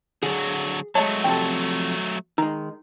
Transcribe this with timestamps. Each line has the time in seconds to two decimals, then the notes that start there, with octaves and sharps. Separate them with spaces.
0.23 D3 F#3 G#4
0.95 F#3 G#3 A3 C#5 D#5 A5
1.24 F2 C3 A4 G5
2.38 D#3 G#3 D#4 A#5